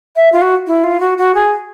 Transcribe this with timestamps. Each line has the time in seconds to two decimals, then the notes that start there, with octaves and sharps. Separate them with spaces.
0.16 E5
0.32 F4
0.41 F#4
0.67 E4
0.84 F4
1.00 F#4
1.18 F#4
1.34 G#4